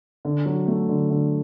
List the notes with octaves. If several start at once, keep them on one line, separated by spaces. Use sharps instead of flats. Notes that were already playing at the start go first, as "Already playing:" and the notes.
D3
F#3
A3
D3
D3